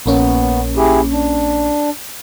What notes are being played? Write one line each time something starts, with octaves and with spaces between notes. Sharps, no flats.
A#1 A#3 B3 C#4
E4 G4 G#4
D4